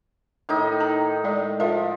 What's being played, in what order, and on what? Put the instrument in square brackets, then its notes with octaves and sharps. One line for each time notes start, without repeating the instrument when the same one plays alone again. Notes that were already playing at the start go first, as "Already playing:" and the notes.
[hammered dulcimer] A2 D#3 D#4
[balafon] A#5
G#3 A4 D5
[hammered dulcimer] F3 [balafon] A#4 E5